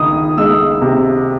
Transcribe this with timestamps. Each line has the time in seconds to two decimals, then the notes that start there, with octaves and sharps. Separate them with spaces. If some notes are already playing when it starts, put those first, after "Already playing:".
Already playing: C#2 D#3 D#6
0.37 G#3 E6
0.81 C3